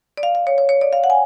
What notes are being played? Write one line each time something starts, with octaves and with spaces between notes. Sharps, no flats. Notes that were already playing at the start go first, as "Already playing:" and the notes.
D5
F5
F5
C#5
C#5
C#5
D5
F5
F#5
G#5